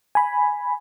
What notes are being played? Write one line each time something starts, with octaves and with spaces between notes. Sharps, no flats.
G#5 B5